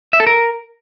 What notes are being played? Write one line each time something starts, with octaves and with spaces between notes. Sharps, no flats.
E5
A4
A#4